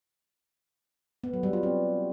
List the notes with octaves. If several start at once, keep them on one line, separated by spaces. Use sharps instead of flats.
B3
F#3
G3
F4
C4